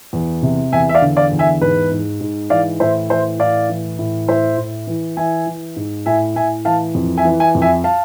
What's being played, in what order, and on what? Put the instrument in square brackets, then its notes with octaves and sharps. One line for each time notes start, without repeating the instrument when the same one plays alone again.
[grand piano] E2
C3
E2 E5 G#5
E5
D5 F5
D3
D5 F5
E2
E5 G#5
G#2 B4
G#2
G#2
E3 D5 F5
A2 C5 E5
E3 C5 E5
A2 D5 F5
E3
A2
A2 C5 E5
A2
E3
E3 E5 G#5
E3
G#2
A2 E5 G#5
A2 E5 G#5
E3 F5 A5
F2
E5 G#5
E3
E5 G#5
F2
E5 G#5
F5 A5